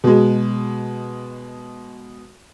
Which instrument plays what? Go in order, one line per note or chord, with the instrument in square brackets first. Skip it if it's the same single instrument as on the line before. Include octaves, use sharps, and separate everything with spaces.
[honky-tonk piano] B2 G#3